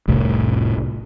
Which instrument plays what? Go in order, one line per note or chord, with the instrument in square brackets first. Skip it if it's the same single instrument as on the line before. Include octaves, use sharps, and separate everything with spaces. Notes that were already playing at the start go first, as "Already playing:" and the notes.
[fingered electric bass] F1 C2 A2